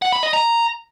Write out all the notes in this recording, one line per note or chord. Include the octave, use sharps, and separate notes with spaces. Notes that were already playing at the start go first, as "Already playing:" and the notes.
F#5
B5
D#5
A#5